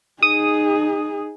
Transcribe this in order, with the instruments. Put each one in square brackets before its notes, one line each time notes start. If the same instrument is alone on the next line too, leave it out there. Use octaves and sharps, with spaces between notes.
[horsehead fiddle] D#4 G#4 [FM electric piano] D#6